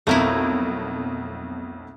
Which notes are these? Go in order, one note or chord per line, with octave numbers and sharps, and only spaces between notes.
B1 F2 A3 A#3 E4